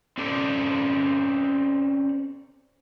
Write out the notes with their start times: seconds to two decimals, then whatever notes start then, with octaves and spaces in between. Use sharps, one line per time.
0.18 C4 C#4 G4 A4 C5 D5